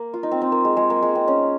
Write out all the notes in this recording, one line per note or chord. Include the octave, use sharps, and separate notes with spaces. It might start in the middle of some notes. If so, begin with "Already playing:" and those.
Already playing: A#3
F4
D#4
C4
C4
A#3
G#3
G#3
A#3
G#3
C4
C#4